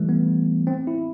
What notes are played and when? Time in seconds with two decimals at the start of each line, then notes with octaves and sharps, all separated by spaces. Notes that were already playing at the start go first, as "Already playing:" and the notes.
Already playing: E3 G3 A3
0.09 B3
0.67 C4
0.87 E4